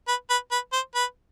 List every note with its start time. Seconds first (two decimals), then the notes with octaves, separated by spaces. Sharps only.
0.08 B4
0.30 B4
0.52 B4
0.73 C5
0.95 B4